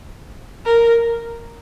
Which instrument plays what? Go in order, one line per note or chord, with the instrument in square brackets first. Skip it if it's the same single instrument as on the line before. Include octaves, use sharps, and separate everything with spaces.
[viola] A#4